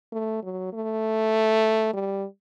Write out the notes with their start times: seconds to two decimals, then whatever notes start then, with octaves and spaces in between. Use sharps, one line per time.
0.12 A3
0.43 F#3
0.73 A3
1.93 G3